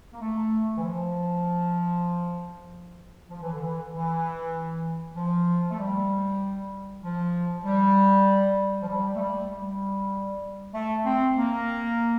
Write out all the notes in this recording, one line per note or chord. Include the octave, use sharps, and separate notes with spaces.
A#3
A3
E3
F3
F3
E3
D3
E3
E3
F3
A3
G3
F3
G3
F3
G3
A3
G3
G3
A3
C4
A#3